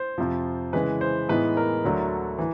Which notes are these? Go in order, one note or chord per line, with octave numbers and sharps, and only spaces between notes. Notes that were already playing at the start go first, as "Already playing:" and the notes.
Already playing: C5
F2 C3 F3
C#3 E3 G#3 B4
C5
A2 E3 G#3 B3 D#4 B4
A#4
D2 D3 F#3 A3 D4
E3